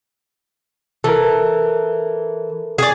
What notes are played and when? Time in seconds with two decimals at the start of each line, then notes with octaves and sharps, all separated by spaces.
1.04 E3 A4 A#4
2.78 G#4 D5